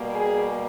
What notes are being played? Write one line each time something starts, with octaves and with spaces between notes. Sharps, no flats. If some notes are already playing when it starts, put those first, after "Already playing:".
Already playing: B2 G3 A#3
G#4